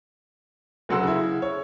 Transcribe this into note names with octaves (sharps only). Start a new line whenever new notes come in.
F1 C#3 F#3 F#5 C6 E6
C#3 E4
C#5